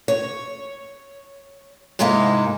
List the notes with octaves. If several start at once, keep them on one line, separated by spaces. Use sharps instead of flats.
C#5
G#2 C3 G#3 A#3 D#4 E4